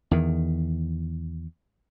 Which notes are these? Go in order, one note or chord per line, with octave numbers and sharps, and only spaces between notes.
E2 D#3